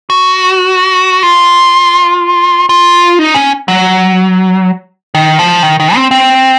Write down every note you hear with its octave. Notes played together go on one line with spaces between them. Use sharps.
F#4
F4
F4
D#4
C#4
F#3
D#3
F3
D#3
D#3
C4
C4